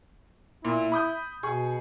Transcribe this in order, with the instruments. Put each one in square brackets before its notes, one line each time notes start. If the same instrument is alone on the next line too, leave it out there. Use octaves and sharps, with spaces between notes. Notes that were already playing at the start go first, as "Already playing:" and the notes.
[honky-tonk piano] A#2 [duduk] E4
[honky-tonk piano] B5 D#6 G6
[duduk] B2 [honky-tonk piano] G#4 C#6